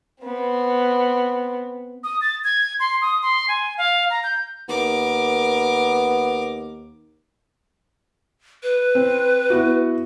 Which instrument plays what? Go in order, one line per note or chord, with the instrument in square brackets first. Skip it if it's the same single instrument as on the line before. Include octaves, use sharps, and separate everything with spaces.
[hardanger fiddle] B3 C4
[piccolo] D#6
A6
G#6
C6
D#6
C6
G#5
F5
A#5
G6
[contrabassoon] D#2 [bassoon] B3 [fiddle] A#4 D6
[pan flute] B4
[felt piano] C4
B3 E4 F#4